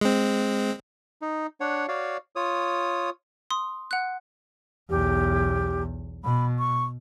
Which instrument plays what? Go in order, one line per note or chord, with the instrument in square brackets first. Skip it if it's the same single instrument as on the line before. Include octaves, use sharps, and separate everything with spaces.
[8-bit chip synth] G#3 C4
[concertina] D#4
D4 C#5 F#5
F#4 C#5 D5 F5
F4 C#5 D#6
[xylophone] C6 D#6
F#5 F#6
[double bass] B1 E2 [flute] G4
[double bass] B2 [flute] B5
[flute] C#6